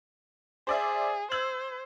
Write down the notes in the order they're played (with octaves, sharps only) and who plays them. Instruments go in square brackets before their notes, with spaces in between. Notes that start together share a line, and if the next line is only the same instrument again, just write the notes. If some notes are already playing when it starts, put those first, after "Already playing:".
[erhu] G#4 [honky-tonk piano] C5 D5 E5
[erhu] C5 [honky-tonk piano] E6 G#6 F#7